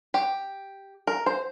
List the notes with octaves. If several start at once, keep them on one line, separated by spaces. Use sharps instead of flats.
G4
A#4
C5